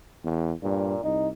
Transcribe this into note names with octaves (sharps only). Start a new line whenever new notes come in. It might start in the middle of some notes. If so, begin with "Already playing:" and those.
E2
G2 A#2
C2 D#4